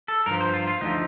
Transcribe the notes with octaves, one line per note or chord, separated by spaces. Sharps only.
A4
G2 F3 A#4
C5
F4
F4
D2 D3 F3 D#4